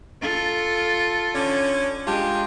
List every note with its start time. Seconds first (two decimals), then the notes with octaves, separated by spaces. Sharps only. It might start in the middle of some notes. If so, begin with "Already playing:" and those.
0.21 F4 A4
1.35 D3 C#4
2.07 G#3 D4 F4 G4